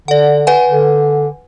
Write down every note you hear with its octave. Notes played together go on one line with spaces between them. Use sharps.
D3 D5 F#5
B4 F#5 G#5
D3